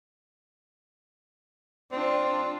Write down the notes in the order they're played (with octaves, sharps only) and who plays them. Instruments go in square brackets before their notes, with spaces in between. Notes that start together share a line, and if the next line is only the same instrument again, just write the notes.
[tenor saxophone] C4 [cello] D4 F4